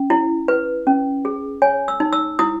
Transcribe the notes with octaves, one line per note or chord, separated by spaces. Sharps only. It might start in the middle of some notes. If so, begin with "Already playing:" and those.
Already playing: C#4
E4
B4
C#4
G#4
C#5 G#5
E6
D#4
E6
E4 D#6